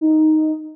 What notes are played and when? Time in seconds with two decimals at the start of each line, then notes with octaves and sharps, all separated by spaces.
0.01 D#4